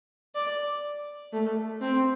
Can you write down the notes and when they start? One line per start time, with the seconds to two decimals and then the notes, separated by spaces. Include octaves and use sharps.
0.35 D5
1.33 A3
1.81 C4